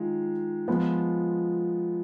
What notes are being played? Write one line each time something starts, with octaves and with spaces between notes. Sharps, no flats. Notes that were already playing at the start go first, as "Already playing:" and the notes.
Already playing: D#3 G#3 F4
F3 G#3 B3 F4